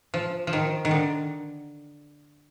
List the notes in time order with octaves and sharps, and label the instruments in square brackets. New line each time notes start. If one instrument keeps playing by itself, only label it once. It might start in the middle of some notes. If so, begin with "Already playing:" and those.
[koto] F3
F3
D#3
D#3
D3